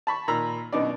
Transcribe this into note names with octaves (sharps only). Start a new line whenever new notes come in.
A5 B5 C#6
A#2 D#3 A#5 B5 E6
F#2 B2 D4 D#4 D5